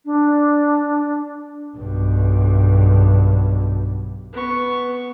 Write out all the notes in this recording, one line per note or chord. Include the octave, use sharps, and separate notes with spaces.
D4
B1 G2
B3 C#6